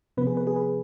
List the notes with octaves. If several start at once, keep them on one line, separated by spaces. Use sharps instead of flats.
C3 F3 B3 B4
G#4
B4
G#4
B4